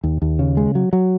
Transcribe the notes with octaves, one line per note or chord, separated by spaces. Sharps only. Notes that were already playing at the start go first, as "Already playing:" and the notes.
D#2
D#2
C#3
G#3
F#3
F#3